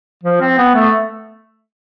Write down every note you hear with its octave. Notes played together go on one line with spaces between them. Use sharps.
F3
C4
B3
A3